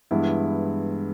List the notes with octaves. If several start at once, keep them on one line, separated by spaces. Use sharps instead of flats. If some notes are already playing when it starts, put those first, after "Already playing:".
G2 E3 G#3 B3 E4